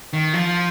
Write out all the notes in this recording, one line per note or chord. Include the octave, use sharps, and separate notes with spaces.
D#3
F3